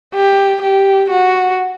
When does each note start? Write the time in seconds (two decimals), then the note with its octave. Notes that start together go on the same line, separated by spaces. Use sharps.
0.14 G4
0.62 G4
1.10 F#4